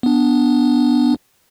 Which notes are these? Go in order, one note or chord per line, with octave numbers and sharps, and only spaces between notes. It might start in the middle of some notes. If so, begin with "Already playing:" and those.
B3 D4